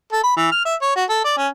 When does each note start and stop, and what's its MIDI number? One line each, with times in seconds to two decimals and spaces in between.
0.13 0.23 69
0.24 0.35 83
0.36 0.49 52
0.52 0.65 89
0.65 0.75 76
0.82 0.96 73
0.96 1.04 66
1.09 1.24 69
1.25 1.36 74
1.37 1.48 61